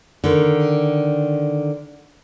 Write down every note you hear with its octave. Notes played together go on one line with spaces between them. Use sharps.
D3 D#3